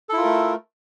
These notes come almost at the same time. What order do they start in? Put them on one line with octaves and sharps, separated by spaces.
A4 E4 F4 A#4 A3